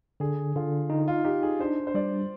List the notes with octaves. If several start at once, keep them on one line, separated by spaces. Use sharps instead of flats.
D3 G#4
D3 F4
D#4
F4
D#4 G4
G#4
D4 C5
C5
G3 D5